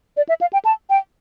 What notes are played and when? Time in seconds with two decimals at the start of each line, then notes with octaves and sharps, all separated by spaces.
0.17 D5
0.29 E5
0.41 F5
0.53 G5
0.65 A5
0.90 G5